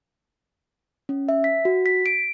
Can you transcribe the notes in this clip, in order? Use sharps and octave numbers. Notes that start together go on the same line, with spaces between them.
C#4
E5
B6
F#4
B6
D7